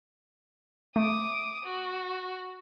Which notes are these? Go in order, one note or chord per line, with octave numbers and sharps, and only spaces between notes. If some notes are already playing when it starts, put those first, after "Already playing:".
A3 D6 D#6
F#4